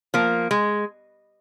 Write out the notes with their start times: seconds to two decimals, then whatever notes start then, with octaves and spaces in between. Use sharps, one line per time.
0.14 F3 A#3
0.51 G#3